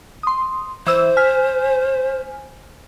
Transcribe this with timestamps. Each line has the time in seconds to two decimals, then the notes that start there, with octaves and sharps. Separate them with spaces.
0.23 C6 D#6
0.86 E3 C5 E6
1.17 G#5 F6 B6